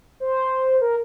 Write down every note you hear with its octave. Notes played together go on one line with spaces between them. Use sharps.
C5
A#4